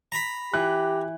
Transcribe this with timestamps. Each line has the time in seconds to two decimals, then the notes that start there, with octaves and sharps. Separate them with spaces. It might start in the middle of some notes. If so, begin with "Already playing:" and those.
0.12 A#5 B5
0.54 E3 G4 F#6